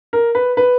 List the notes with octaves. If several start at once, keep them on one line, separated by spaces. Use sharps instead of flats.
A#4
B4
B4